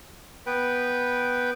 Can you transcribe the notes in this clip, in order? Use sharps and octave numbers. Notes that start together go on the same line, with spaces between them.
B3 B4 G5